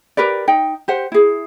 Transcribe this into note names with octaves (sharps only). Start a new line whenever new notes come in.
G4 A#4 B4 D5
D#4 G5
G4 C5 F#5
E4 G#4